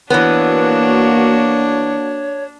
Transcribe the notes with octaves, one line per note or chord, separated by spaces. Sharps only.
E3 A#3 B3 D4 F#4 C#5